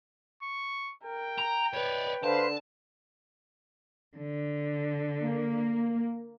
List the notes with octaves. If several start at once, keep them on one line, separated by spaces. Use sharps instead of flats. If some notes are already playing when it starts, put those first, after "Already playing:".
C#6
A#4 G5
A#5
B4 C#5 D5
D3 B4 C5 F5 A5
D3
A#3